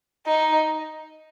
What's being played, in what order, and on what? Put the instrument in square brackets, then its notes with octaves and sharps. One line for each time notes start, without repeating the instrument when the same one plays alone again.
[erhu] D#4